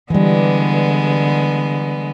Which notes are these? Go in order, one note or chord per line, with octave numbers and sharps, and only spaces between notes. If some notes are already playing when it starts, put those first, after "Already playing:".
D3 E3 G3 G#3 B3